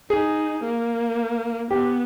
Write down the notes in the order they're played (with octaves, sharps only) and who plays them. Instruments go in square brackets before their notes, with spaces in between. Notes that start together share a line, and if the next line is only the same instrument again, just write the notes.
[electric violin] D#4 [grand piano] G#4
[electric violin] A#3
[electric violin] B3 [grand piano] G4